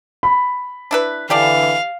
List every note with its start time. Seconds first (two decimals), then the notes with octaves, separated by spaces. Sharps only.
0.23 B5
0.91 D4 E4 B4
1.30 D3 E3 G4 D5 F5 A5